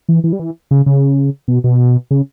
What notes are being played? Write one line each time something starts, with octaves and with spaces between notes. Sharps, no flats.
E3
E3
G3
E3
C#3
C#3
B2
B2
C#3